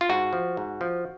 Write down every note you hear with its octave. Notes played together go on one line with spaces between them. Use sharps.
F4
G#2 F#4
F3
G#2
F3